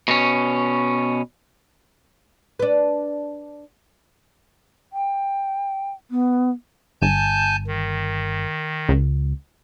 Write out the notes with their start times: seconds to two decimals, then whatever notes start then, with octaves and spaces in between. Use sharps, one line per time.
0.08 B2 C#4
2.59 D4 B4
4.93 G5
6.11 B3
7.01 G1 G#5 A5 G6
7.67 D#3
8.89 C#2